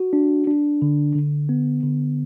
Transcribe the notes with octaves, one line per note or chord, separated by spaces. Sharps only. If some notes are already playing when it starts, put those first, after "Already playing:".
Already playing: F#4
D4
D4
D3
D3
B3
D3